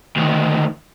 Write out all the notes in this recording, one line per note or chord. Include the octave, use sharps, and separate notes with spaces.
D2 D#3